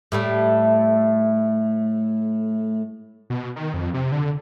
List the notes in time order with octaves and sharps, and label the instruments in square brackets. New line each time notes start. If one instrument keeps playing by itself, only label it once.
[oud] A2 G3 A3
[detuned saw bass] B2
D#3
F2
C3
D3